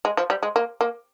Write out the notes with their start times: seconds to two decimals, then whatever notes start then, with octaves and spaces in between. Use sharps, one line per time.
0.05 G#3
0.17 F3
0.30 G3
0.43 G#3
0.56 A#3
0.81 A#3